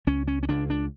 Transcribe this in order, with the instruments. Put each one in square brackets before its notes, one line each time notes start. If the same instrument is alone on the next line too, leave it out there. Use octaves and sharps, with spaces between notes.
[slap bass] C#2 C#4
C#4
C#4
C#2 D4
D4